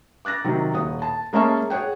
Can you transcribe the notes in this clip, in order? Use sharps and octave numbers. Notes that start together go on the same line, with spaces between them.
D6 F#6 A6 A#6
C3 D#3 F#3
D#1 F#5 D#6
A5
G#3 A#3 C#4 E5 A5 C#6
G#4 C#5 F#5 G5